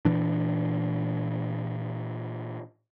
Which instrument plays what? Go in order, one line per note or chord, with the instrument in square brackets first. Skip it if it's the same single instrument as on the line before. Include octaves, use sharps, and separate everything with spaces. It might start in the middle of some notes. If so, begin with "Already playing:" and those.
[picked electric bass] A#2 E3 D4